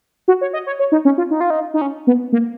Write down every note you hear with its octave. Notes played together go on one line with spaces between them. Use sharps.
F#4
C#5
D#5
C#5
C#5
D#4
C#4
F4
D#4
F4
D#4
D#4
C#4
B3
A#3